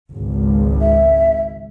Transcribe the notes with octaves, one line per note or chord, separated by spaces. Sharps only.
G#1 C#2
E5